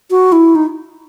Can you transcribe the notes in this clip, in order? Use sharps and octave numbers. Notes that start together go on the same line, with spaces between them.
F#4
E4
D#4